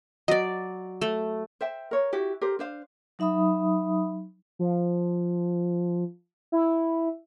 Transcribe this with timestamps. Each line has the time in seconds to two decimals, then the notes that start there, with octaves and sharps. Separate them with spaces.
0.28 F#3 D5 D#5
1.01 A3
1.61 C5 E5 G5
1.91 A#4 C#5
2.13 E4 F#4 G4
2.41 G4 A#4 C5
2.59 D4 C5 F5
3.19 F#3 D#4 E5 B5 D#6
4.59 F3
6.52 E4